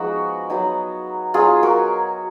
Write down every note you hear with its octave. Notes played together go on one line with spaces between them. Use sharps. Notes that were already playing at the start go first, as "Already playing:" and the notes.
Already playing: F3 G#3 B3 D#4 F#4
F#3 B3 D#4
F#3 B3 D#4 F4 G#4
F#4 A#4